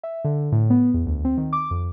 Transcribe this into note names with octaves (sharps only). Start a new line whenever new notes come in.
E5
D3
A2
B3
E2
D2
C4
D#3
D6
F2